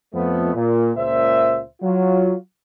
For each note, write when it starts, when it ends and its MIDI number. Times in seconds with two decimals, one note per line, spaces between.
0.14 0.52 41
0.14 0.52 53
0.14 0.52 57
0.14 0.52 59
0.55 0.91 46
0.97 1.61 37
0.97 1.61 46
0.97 1.61 72
0.97 1.61 76
1.82 2.34 54
1.82 2.34 65